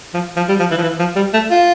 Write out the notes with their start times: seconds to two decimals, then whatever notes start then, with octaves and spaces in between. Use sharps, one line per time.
0.14 F3
0.37 F3
0.48 G3
0.60 F3
0.71 E3
0.77 F3
0.82 E3
0.99 F3
1.16 G3
1.33 A3
1.50 F4